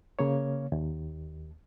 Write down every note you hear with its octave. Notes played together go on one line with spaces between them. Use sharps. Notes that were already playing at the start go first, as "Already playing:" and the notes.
C#3 A#3 C#5
D#2